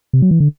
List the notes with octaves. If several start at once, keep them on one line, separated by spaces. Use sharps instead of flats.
C3
F#3
E3
D3